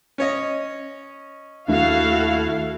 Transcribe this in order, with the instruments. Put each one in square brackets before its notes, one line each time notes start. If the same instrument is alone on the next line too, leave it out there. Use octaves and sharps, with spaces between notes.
[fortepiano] C#4 C#5 D#5
[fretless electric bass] D#2 A3 D4 [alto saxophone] E4 [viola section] F#4 A4 F5